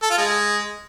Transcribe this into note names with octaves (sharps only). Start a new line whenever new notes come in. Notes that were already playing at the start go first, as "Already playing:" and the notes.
A4
F4
G#3